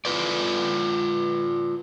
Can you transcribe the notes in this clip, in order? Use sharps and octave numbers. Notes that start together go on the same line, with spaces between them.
F4 B4 D5